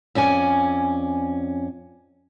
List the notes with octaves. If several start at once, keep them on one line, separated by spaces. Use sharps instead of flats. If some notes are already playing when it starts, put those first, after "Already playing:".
F2 C#4 D5 G#5